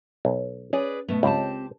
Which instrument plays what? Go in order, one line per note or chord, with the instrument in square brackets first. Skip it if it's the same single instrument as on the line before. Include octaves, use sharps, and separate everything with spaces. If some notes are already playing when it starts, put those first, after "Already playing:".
[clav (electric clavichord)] B1
[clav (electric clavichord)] C#4 [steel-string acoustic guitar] G#4 B4 D5
[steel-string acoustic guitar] B2 A3 B3
[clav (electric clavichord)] C#2 [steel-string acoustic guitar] C4 G4 A5